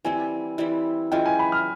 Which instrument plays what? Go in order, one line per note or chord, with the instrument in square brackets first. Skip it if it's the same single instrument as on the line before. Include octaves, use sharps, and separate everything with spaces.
[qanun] E3 G3 C4 E4 [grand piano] G#5
[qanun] E3 G3 C4 E4
[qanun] E3 G#3 C#4 F4 [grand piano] G5
[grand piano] G#5
B5
F6